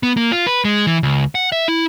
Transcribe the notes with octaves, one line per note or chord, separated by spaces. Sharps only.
B3
A#3
F4
B4
G#3
E3
C#2
F#5
E5
E4